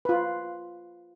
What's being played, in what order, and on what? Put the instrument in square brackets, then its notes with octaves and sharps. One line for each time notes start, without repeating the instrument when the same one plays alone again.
[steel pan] F4 B4